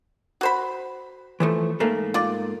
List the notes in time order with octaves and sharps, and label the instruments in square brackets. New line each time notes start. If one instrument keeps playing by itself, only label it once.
[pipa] F#4 C5 B5
[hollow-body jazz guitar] E3 F3 A3
G#2 A3 A#3
[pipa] F4 D5